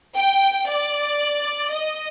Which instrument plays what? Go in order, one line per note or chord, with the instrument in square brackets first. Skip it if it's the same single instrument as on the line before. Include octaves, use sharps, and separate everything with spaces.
[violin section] G5
D5
D#5